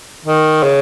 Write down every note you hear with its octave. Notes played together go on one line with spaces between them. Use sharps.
D#3
C#3